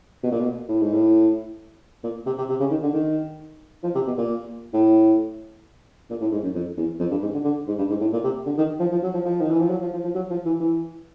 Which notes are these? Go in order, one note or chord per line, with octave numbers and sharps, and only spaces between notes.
B2
A#2
B2
A2
G#2
A2
A#2
C3
C3
C3
C#3
D#3
D3
D#3
F3
C3
B2
A#2
A2
A#2
A2
G#2
F#2
F2
E2
F2
G2
G#2
D3
D3
G#2
G2
G#2
A2
A#2
C3
D3
D#3
F3
F3
F#3
F3
F3
D#3
E3
F3
F#3
F3
F3
F3
F#3
F3
E3
E3